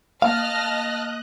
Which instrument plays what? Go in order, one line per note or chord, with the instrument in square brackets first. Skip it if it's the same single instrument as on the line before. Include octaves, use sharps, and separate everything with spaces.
[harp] A#3 [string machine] D#5 F#6 [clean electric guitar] F5 [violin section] A5 F6 A#6